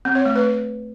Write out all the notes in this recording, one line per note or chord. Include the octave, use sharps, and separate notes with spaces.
C4
C#5
A3
B4